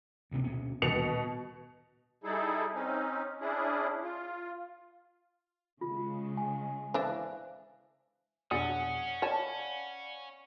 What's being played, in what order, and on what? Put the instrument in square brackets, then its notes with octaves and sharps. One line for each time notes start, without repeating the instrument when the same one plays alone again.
[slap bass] D2 C3 A3
D2 B2 C#4
[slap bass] D#1 D2 [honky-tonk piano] B2 C#7 F7
[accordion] G3 D#4 E4 G#4 A4
C4 C#4 D#4
C#4 D4 E4 G#4
F4
[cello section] C#3 G#3 [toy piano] F4
[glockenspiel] G#5
[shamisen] E3 D4 [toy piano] C5 E5 F5
[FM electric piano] F2 B2 C#5 [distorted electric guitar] C#4 [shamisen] D4 G#4 [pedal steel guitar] F#5 D#6
[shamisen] C#5 A5 [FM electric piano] D5 F5 B5